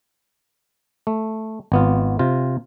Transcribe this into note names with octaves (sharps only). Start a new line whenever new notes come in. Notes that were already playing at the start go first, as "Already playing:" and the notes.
A3
G#1 B3 F4
C3 F4